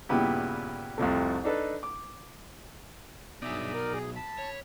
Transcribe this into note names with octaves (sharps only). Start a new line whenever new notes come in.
G2 A#2 C#3 B3 E4 G4
C2 F2 C3 A3
D4 D#4 A4 B4
D6
G2 B2 F#3 D#4 G#4 D5 E5
A#4
G#4
A5 B5
C#5